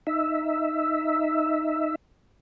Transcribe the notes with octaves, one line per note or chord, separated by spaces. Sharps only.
D#4 E5